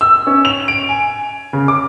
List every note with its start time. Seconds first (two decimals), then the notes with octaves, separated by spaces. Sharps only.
0.01 E6
0.27 C#4
0.45 F7
0.68 D7
0.89 G#5
1.53 C#3
1.68 D6